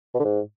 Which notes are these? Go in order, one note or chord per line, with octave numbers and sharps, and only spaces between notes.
B2
D3
G#2